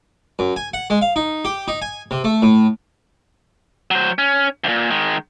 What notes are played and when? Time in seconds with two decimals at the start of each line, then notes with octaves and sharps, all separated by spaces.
0.39 F#2
0.56 G#5
0.74 F#5
0.90 G#3
1.01 F5
1.16 D#4
1.45 G4
1.68 D#4
1.82 G#5
2.11 C3
2.24 A3
2.42 A2
3.91 F#3 C5
4.19 C#4
4.64 D2 A#2
4.91 D#3 G#3